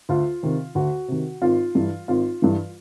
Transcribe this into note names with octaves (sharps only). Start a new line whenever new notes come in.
D2 F4
C3 D#3
D2 F#4
C3 D#3
G#1 F4
G2 E3
G#1 F4
G2 E3